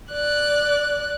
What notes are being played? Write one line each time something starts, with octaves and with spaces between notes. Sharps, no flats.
D5 F#6